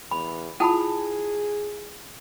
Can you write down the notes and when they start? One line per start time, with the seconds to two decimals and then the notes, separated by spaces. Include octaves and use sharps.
0.11 E2 B5
0.60 E4 F4 G#4 F#5 A5 B5